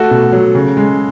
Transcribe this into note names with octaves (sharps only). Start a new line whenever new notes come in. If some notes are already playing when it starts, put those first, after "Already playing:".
Already playing: A3 F#4 A4
B2
F#3
C#3
G#3